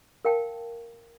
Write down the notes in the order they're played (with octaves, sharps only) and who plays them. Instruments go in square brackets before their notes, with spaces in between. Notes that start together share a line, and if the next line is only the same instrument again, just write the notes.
[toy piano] A#4 F5 G5 A5